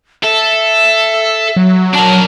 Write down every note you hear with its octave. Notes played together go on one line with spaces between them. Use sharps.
A4 E5
F#3
D4 A#4 A5